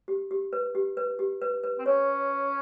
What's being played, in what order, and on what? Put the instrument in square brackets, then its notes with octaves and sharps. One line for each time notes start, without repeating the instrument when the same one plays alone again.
[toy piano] G4
G4
B4
G4
B4
G4
B4
B4
[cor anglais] C4
[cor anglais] C#4 [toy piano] C#5